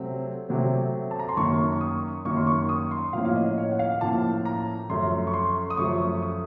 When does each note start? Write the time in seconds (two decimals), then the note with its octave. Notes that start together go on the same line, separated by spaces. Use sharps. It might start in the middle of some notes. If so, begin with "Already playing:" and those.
Already playing: C3 F#3 A3 C4
0.49 C3 F#3 A3 C4
1.11 A5
1.19 A#5
1.29 C6
1.37 F#2 D#3 A#3 C#6
1.72 C#6
1.81 D#6
2.25 F#2 D#3 A#3 C#6
2.37 C6
2.47 C#6
2.69 D#6
2.91 C6
3.13 A2 F3 A#3 C#4 F5
3.25 F5
3.35 D#5
3.57 C#5
3.71 F#5
3.79 F5
4.01 A2 F3 A#3 C#4 A5
4.45 A#5
4.90 F#2 F3 A3 C6
5.27 C#6
5.34 C6
5.70 D#6
5.77 F#2 F3 A3 C#6
6.22 D#6